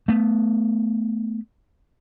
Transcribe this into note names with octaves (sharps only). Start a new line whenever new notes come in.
A3 B3